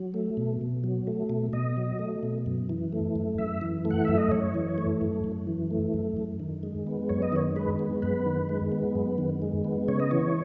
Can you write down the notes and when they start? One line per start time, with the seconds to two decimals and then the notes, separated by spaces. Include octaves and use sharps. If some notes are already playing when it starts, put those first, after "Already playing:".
Already playing: F#3
0.14 A3
0.37 B2
0.61 B2
0.84 F#3
1.07 A3
1.30 B2
1.53 B2 D#5
1.77 F#3
1.99 A3
2.23 B2
2.46 F#2
2.69 E3
2.92 A3
3.15 F#2
3.38 F#2 E5
3.61 E3
3.85 A3
3.91 F#5
4.05 F#2 E5
4.18 D#5
4.32 F#2 C#5
4.54 E3
4.78 A3
5.01 F#2
5.24 F#2
5.47 E3
5.71 A3
5.94 F#2
6.17 F#2
6.40 D#3
6.63 G#3
6.87 B3
7.09 F#2 C#5
7.22 D#5
7.32 D#3 C#5
7.56 G#3 B4
7.79 B3
8.02 F#2 B4
8.26 D#3
8.49 G#3
8.72 B3
8.95 F#2
9.18 D#3
9.42 G#3
9.64 B3
9.88 C#3 C#5
10.00 D#5
10.11 E3 C#5